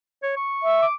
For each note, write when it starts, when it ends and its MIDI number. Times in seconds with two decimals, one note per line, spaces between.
0.23 0.32 73
0.37 0.82 85
0.63 0.86 76
0.82 0.94 86